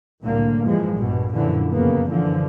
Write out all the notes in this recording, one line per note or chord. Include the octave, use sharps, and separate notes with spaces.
C2 A2 D3 A#3
G2 E3 F3 G#3
A#1 G2 B2
F#2 A#2 D3 E3 F3
F2 C#3 A#3 B3
F#2 D3 E3 F3